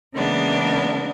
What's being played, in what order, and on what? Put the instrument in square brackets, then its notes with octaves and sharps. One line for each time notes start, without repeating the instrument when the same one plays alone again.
[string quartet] C#3 E3 G#3 A#3 B3 D4